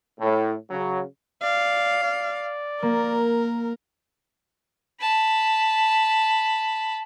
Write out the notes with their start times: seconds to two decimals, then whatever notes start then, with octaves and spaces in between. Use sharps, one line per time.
0.20 A2
0.71 C#3 F#3
1.43 D5 F5
2.03 D5
2.83 A#3 A#4
5.01 A5 B5